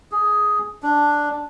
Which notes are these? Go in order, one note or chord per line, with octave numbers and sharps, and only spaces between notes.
G#4
D4